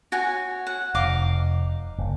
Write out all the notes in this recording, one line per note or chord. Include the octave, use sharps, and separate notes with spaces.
F#4 C#5 G#5
F#5
F1 D#4 F5 D6
F#1